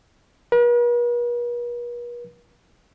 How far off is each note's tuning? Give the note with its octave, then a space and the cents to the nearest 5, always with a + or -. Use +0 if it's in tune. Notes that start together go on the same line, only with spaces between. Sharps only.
B4 -45